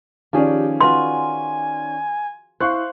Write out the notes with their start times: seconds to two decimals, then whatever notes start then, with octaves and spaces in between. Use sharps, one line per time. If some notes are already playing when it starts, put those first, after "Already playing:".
0.33 D#3 F3 C#4 G4 G#4 D5
0.81 F4 F#4 B4 G#5 C6
2.60 E4 C5 F5 C#6 F#6